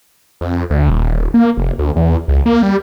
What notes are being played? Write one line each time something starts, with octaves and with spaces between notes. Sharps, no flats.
F2
D2
D#1
A#3
F1
D2
E2
C#2
A#3
G3